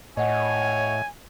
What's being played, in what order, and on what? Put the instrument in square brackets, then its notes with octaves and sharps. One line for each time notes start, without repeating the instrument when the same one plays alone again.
[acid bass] A2 [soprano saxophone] C#5 [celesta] D#5 F#5 [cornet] G#5